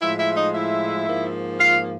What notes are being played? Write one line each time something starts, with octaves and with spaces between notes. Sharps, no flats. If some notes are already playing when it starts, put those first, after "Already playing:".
A2 F3 G#3 E4 E5
E4 E5
E5
D#4 D#5
E4 E5
G#2 F3 A#3
F4 F5